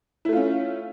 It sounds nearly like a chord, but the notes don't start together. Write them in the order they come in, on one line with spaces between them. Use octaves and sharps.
E4 A3 F4 C#4